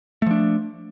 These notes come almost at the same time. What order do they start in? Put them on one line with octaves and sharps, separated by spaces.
A3 F3 D4